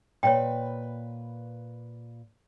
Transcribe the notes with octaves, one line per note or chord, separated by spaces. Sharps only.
A#2 B4 C#5 G5